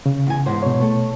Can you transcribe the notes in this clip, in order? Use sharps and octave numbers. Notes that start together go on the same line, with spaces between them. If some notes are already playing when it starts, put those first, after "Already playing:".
C#3
E2 G#5
E2 G#2 C5
B2 C#5
A3 A4